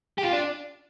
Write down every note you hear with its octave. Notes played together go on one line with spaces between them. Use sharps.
G4
F4
D4